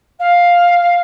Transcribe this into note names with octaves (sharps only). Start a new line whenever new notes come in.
F5